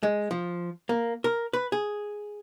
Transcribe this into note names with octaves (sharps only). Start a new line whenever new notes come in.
G#3
F3
A#3
A#4
B4
G#4